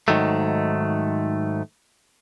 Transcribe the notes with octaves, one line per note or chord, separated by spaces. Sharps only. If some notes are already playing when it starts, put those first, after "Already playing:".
G#2 D#3 F#3 A3